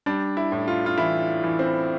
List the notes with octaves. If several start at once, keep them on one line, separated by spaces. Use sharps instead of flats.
G3 D4
E4
A2
F4
F4
E3 E4
E3
C4